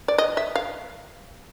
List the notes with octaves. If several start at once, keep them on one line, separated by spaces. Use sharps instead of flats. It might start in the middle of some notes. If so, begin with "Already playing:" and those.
D5
D#5
E5
F5